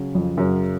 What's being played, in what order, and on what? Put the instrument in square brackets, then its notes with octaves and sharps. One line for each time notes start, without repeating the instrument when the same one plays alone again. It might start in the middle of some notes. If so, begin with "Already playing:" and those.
Already playing: [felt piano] C#3 F#3 C#4 G#4
[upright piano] F2
[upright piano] F#2 [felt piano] C#3 F#3 C#4 G#4